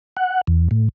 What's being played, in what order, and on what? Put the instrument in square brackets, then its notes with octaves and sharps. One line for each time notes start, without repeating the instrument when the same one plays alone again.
[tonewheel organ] F#5
E2
A2